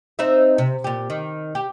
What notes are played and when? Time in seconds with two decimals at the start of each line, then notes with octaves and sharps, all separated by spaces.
0.19 C4 D#4 E5
0.58 C3
0.84 A#2 G4
1.10 D#3
1.55 G4